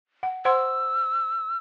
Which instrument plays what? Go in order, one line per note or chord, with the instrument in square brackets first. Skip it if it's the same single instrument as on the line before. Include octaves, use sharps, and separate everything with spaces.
[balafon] F#5
[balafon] C5 F#5 C6 [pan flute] E6